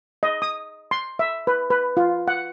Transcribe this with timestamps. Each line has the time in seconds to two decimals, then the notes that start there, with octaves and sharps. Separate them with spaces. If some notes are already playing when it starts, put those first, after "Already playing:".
0.23 D#5
0.42 D#6
0.91 C6
1.19 E5
1.47 B4
1.70 B4
1.97 F4
2.28 F#5